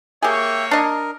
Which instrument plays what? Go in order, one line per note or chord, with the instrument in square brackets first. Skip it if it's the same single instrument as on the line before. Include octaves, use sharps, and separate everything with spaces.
[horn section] A#3 C#5 [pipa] G4 G#4 [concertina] E5 G5
[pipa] D4 D#5 [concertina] A#4